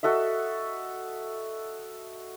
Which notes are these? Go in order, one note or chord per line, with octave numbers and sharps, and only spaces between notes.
F#4 A4 D#5 E5